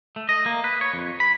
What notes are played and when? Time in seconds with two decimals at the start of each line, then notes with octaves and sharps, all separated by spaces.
0.16 A3
0.29 D#5
0.46 A#3
0.64 B4
0.81 C#5
0.94 F2
1.20 B5